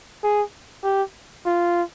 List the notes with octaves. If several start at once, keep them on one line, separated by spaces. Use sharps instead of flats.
G#4
G4
F4